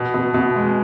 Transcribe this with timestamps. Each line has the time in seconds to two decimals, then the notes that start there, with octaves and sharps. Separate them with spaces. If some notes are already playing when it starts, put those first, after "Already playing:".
Already playing: B2
0.14 B2
0.34 B2
0.56 G#3